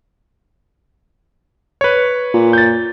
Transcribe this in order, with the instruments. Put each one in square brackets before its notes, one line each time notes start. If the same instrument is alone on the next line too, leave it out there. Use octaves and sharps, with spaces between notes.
[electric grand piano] B4 C#5
[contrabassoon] A#2
[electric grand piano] G6 A6